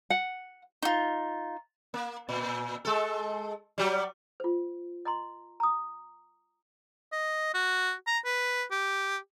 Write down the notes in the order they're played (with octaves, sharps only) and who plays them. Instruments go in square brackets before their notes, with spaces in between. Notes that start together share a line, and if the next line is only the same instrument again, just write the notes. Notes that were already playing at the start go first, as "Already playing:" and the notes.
[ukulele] F#5
[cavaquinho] D#4 F4
[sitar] A#3
A#2
G#3 A4
F#3 G3
[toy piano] F4 C5
D#5 A#5 C6
A#5 D#6
[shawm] D#5
F#4
A#5
B4
G4